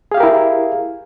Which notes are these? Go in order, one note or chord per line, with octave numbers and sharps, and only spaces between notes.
E4 G4 G#4 A#4 F5